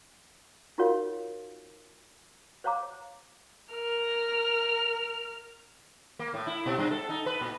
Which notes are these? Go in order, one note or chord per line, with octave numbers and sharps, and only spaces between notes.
D#4 F4 F#4 A#4 C#5 F5
C5 C#5 F5 A#5 D6
A#4 F6
A#3
A2
E4
B2
G2
A4
D#4
B4
A#2